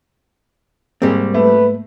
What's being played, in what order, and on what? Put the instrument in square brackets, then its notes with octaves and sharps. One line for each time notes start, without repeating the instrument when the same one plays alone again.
[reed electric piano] G#2 G#3 A#3 [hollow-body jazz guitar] G3 C4
[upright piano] A3 [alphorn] B4